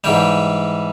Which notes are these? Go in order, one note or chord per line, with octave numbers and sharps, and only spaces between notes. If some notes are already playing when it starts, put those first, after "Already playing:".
G#2 E3 G3 G5